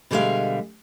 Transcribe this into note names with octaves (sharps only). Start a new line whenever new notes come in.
B2 D3 G3 G#3 E5 F5